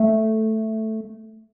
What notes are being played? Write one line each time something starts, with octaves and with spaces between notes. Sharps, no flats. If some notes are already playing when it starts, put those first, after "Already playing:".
Already playing: A3